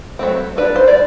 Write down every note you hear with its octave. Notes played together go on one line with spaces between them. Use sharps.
F#3 A3 C4
G3 D4 B4
C5
D5